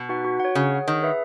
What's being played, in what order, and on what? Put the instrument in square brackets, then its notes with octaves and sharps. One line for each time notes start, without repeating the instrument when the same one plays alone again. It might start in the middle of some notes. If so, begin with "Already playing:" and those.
Already playing: [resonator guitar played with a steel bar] B2
[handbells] D#4 F#4 B4 F#5
F#4
C#5 F#5
[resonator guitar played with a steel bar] C#3 [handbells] G#4
[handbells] C#5 F#5
[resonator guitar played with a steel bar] D#3 [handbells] G#4
[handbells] B4 E5